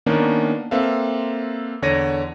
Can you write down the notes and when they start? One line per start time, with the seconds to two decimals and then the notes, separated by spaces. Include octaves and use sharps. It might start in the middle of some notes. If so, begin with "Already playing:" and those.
0.06 D#3 A#3 B3 C#4 D4
0.71 A#3 C4 A4 B4 E5 F5
1.82 E2 D3 C#5 D5 A#6 D#7